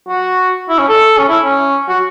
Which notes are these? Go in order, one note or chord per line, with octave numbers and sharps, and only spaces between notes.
F#4
E4
C#4
A4
C#4
E4
C#4
F#4